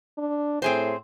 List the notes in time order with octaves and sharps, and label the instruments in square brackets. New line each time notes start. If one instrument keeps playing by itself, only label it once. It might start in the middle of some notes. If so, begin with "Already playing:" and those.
[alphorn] D4
[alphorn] A2 [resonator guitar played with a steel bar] C4 G#4 C5